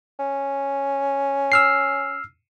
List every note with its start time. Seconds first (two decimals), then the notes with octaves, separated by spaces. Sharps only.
0.19 C#4
1.52 E6 F6 C7